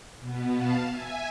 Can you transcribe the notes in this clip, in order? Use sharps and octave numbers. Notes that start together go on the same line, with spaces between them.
B2 B3
F5 A5
E5 G#5